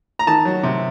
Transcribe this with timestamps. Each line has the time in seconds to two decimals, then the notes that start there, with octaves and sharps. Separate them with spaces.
0.19 A#5
0.27 D#3 A5
0.45 F#3
0.63 C3